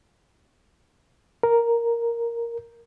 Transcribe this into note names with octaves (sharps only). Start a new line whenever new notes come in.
A#4